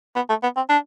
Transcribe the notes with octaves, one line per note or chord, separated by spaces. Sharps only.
B3
A3
B3
C4
D4